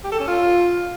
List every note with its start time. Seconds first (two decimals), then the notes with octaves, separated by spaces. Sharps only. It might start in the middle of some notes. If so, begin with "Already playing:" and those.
0.04 G4
0.12 A4
0.20 C#4
0.28 F4